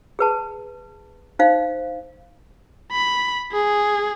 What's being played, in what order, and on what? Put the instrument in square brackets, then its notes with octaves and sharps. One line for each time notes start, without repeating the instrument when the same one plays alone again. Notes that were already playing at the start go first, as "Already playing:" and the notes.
[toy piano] G#4 B4 A5
D#4 C5 F5
[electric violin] B5
G#4